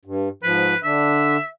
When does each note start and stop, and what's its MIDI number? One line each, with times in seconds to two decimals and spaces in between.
0.05 0.29 43
0.43 0.74 44
0.43 0.74 53
0.43 0.77 71
0.83 1.37 50
0.83 1.37 62
0.83 1.48 76